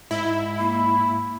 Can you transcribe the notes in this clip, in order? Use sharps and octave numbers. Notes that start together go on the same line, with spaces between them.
G#2 E4 D#5
A#3 B5